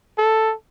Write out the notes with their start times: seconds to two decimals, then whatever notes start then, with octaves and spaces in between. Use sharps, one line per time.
0.18 A4